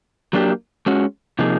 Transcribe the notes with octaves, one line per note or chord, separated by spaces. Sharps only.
F#3 A#3 D4 G4
G#3 C#4 F#4
C3 F3 A#3 D#4 G#4